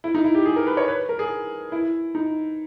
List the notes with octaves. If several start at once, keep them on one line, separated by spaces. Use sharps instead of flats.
E4
D#4
E4
G4
G#4
A#4
B4
C#5
B4
A#4
G#4
E4
D#4